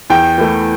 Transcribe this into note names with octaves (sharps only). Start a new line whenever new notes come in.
E2 G5
E3 A3